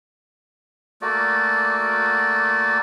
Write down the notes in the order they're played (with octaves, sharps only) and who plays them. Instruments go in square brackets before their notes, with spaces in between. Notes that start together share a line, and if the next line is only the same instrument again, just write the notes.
[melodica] A3 A#3 F#4 D5